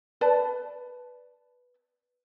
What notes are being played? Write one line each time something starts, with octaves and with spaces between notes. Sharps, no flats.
B4 D5 A5